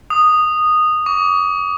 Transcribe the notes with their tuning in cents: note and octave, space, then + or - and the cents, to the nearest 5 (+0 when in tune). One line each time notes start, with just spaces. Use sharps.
D#6 -10
D6 -40